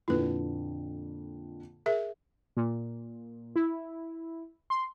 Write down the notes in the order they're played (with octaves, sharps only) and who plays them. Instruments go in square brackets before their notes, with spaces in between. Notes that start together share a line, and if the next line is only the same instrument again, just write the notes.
[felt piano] F2 A#2 D3 [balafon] E4 B4
[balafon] G#4 A#4 E5
[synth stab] A#2
E4
C6